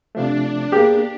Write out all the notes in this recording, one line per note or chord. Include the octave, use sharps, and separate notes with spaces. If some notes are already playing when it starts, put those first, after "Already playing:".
C3 F3 A3 D4
A#3 B3 G4 G#4